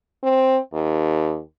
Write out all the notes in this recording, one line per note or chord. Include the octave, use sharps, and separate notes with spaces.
C4
D#2